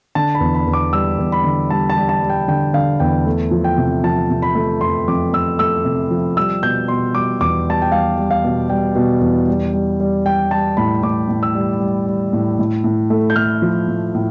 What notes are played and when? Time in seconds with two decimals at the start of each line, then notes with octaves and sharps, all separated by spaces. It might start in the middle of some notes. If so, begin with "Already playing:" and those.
0.15 D3 A5
0.35 B5
0.40 E2
0.55 B5
0.67 E2
0.73 D6
0.92 G3 E6
1.19 E2
1.32 B5
1.44 D3
1.70 G3 A5
1.90 A5
1.97 G3
2.09 A5
2.23 G3
2.29 G5
2.48 D3 G5
2.74 D3 F5
3.00 E2 G5
3.26 A3
3.51 F3
3.64 G5
3.78 C3
4.03 F3 A5
4.30 C3
4.42 B5
4.55 A3
4.81 F2 C6
5.08 F2 D6
5.33 A3 E6
5.59 A3 E6
5.85 C3
6.11 F3
6.37 G3 E6
6.62 B2 G6
6.88 B2 C6
7.14 G3 D6
7.41 E2 D6
7.67 G3 A5
7.82 G5
7.92 G3 F5
8.18 G3
8.31 F5
8.44 B2
8.70 G3 G5
8.95 B2
9.21 E2
9.48 G3
9.73 G3
10.00 G3
10.26 G3 G5
10.51 G3 A5
10.77 A2 B5
11.03 A2 D6
11.29 A2
11.43 E6
11.55 G3
11.80 G3
12.06 G3
12.33 A2
12.59 A2
12.84 A2
13.10 A3
13.30 G6
13.36 A3 F6
13.62 F3
13.88 A2
14.15 A2